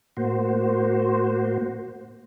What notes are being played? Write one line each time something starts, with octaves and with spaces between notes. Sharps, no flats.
A2 A#3 F#4 C5